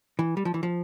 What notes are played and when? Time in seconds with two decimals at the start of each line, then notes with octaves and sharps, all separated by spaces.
0.19 E3
0.37 G3
0.45 F3
0.54 E3
0.63 F3